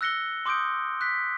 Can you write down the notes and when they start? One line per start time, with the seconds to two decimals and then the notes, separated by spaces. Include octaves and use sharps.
0.01 E6 F#6 A#6 C#7 G7
0.46 C6 D6 D#6 G6 D7
1.01 F#6 B6